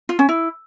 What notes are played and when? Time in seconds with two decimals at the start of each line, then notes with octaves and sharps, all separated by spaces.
0.09 F4
0.19 C#4
0.29 E4